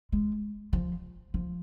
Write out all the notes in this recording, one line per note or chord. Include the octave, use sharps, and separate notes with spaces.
G#3
F3
F3